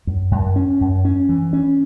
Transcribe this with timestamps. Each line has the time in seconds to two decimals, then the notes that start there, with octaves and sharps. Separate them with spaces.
0.07 F#2
0.31 F#2
0.56 C#4
0.81 F#2
1.05 C#4
1.29 E3
1.53 C#4